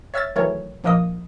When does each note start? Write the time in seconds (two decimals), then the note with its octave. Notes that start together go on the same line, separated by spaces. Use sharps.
0.14 C#5 E5 E6 F6 G#6 A6
0.36 D#3 E3 F#3 A3 A#4 C#5
0.84 A#1 F3 A#3 A#4 D#5 D#6